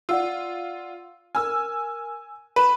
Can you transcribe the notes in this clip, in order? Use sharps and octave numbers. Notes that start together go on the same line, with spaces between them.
F4 D5 F#5 E6
A#4 G#5 E6 F6
B4 B5 E7